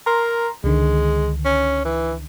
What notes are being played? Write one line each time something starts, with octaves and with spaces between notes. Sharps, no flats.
A#4 A#5 C6
C#2 D3 D#3 G#3
C#4
E3